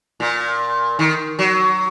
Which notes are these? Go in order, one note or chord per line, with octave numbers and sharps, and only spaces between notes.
A#2
D#3
F#3